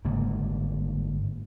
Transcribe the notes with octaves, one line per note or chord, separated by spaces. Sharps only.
G1 G#2 C#3 A#3